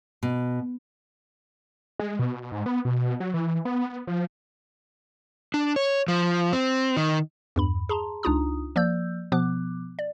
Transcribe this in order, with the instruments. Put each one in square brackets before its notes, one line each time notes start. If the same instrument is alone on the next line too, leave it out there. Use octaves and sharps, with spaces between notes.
[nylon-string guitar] B2
[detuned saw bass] G#3
B2
G#2
B3
B2
F#3
E3
B3
F3
[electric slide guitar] D4
C#5
F3
C4
D#3
[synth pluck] E2 G2 B5
G#4 A5 A#5 C6
C#2 D4 D#4 F4 A#5 D#6
F3 A#3 D5 E6 G6
B2 F3 B3 D6 F#6
D5